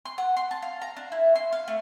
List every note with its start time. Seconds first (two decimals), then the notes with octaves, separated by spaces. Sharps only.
0.05 C6
0.18 F#5
0.37 C6
0.51 A5
0.62 F5
0.81 A#5
0.97 D4
1.12 E4
1.36 C6
1.53 F5
1.68 A3